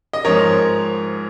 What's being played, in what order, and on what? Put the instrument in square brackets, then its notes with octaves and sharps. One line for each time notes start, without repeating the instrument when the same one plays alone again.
[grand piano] D#5
G#2 F3 A#4 C#5